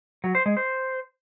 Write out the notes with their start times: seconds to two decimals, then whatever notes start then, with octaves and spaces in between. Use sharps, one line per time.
0.24 F#3
0.35 C5
0.46 G#3
0.57 C5